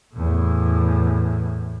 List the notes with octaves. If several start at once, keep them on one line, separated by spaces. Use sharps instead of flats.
E2 A2